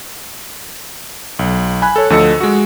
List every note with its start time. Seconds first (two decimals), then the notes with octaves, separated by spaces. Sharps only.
1.39 B1
1.82 G#5 B5 F#6
1.96 A4 C#5
2.10 D2 F3 A4 D#5 E6 C#7
2.40 G#3 F#4